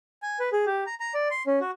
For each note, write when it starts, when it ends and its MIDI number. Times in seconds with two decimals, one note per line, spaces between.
0.22 0.39 80
0.40 0.49 71
0.52 0.65 68
0.66 0.84 67
0.87 0.95 82
1.00 1.14 82
1.14 1.28 74
1.31 1.43 84
1.46 1.59 61
1.61 1.71 66